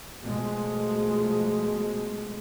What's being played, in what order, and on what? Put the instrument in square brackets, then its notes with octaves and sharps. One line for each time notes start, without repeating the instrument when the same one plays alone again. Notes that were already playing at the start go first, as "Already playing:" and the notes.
[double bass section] B2 F3 G#3 A3